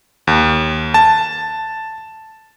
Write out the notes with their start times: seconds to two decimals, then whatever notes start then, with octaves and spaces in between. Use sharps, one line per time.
0.27 D#2
0.94 A5